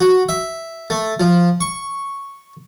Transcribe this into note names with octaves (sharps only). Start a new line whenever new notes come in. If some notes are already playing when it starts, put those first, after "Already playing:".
F#4
E5
A3
F3
C#6